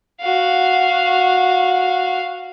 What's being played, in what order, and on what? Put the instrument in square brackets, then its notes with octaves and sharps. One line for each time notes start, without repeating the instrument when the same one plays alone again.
[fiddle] F#4 F5